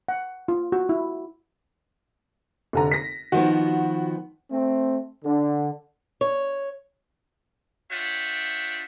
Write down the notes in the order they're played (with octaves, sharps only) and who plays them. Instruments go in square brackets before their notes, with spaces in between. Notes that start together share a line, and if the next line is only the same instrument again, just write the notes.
[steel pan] F#5
F4
F#4
E4
[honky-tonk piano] F1 D3 A#5
A#6 B6
[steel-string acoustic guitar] D#3 F3 B3 [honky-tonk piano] F#4
[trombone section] A3 C4
D3
[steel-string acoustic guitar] C#5
[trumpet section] D4 F4 C#5 E5 F#5 G5